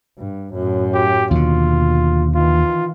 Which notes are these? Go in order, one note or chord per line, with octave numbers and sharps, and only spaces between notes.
G2
F#2 A2
G4
D#2 B2 D3 F4
D#3 E3 F4